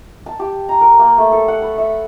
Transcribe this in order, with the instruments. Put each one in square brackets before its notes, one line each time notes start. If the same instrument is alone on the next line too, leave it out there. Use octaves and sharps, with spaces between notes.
[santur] A5
G4
A#5
A#4
A#3
A3
A4
F#5
B4
E5